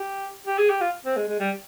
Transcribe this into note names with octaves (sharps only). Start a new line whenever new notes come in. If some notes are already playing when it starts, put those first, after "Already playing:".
Already playing: G4
G4
G#4
G4
F4
C4
G#3
G#3
G3